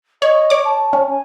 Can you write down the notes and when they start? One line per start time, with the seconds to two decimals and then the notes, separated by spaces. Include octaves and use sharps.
0.22 C#5 D#5
0.50 C#5 D6
0.65 A5
0.93 C#4
1.08 G#5